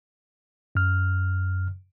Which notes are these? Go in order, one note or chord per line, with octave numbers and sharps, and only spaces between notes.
F#2 F6